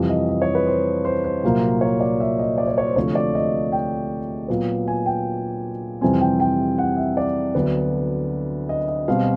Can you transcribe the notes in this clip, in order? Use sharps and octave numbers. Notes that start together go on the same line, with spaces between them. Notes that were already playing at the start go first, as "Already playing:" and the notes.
Already playing: F2 C3 E3 G3
D#5
D#5
C#5
B4
C5
C5
C5
C2 A#2 F#3 A#3
C#5
D5
E5
D#5
D5
C#5
C#5
C5
D2 C3 F3 A3 C#5
D5
D#5
G5
A#2 F#3 B3
G#5
G5
F2 C3 E3 G3 C4 G#5
G5
G5
F#5
E5
D5
D2 D3 F#3 B3
D#5
D#5
B2 G3 C4 F5